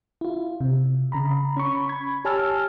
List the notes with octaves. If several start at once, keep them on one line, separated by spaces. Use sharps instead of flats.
E4 F4
C3
C#3 A#5 B5
C#4 B5 C#6
B5 G#6
G4 C#5 G#5 A5 E6 F6